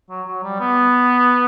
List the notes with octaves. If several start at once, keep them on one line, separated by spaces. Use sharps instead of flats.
F#3
F#3
G3
B3